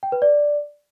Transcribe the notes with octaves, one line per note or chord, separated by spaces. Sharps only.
G5
B4
D5